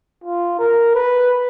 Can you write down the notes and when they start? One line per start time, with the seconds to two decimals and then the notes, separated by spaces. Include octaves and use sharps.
0.24 F4
0.59 A#4
0.95 B4